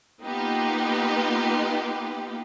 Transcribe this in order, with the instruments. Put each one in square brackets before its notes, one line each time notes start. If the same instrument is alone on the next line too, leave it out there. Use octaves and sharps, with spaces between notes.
[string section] A#3 B3 D#4 F4 G4 B4